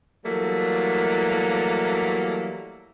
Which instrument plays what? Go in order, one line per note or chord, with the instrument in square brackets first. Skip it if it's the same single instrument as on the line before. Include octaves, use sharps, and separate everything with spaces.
[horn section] E3 F#3 G3 A3 A#3